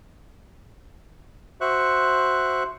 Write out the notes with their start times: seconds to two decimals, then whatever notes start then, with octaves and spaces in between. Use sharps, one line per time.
1.61 F#4 C5 E5 C#6 F#6